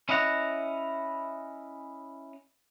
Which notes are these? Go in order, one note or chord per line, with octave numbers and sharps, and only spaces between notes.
C#4 E4 D#5 F#5 A#5